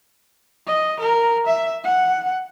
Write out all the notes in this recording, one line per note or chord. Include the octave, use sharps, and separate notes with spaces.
D#5
A#4
E5
F#5